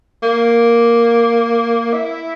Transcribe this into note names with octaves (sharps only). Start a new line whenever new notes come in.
A#3
E4